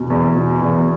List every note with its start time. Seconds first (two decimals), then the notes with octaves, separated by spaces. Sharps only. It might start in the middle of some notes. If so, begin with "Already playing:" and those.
Already playing: E2 B2
0.10 E2
0.36 B2
0.62 E2